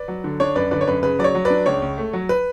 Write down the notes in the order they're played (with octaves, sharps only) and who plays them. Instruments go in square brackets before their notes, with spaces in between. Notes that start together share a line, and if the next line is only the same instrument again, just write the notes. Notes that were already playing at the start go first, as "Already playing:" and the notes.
Already playing: [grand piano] B4 D5
F#3
D3
D4 C#5
F#2 B4 D5
D3 B4 D5
C#5
F#2 B4
C#3 B4
F#3 D5
C#5
F#3
B4 D5
D4
C#2 C#5
C#2
A3
F#3
B4